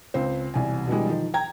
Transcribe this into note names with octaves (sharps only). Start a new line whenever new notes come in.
C#2 C4 C5
E1 C2 G#5
B2 D3 E3 G3 G#3
D#3 F3
G5 A#5 G#6